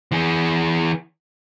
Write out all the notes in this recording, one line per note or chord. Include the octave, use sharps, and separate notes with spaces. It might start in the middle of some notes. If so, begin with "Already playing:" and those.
E3 G#4